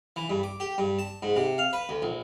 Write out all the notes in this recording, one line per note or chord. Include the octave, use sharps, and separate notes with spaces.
E3
G2
D6
G4
G2
A5
G#2
C3
F5
B4
D2
A#1